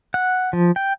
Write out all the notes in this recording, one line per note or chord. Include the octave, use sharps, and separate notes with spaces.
F#5
F3
G5